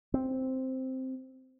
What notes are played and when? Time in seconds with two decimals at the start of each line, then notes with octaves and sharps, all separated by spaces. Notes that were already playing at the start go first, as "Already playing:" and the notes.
0.14 C4